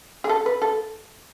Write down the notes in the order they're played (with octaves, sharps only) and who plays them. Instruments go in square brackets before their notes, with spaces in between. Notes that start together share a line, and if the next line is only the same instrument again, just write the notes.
[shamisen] G#4
A4
B4
A4